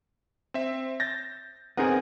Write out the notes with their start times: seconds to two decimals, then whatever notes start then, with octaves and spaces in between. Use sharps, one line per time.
0.54 C4 E5
1.00 G6 A6 A#6
1.77 B3 C4 D#4 G#4 A#4 F#5